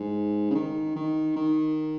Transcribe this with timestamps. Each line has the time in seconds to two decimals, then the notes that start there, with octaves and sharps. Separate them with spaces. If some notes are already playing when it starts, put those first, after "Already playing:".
Already playing: G#2
0.50 C#3
0.55 D#3
0.96 D#3
1.36 D#3